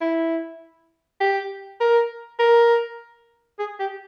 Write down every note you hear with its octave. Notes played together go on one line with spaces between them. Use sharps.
E4
G4
A#4
A#4
G#4
G4